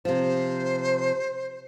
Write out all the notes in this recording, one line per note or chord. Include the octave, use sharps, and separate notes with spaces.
C3 F3 C5